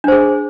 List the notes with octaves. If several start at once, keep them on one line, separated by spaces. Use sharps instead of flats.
D4 G#4 C5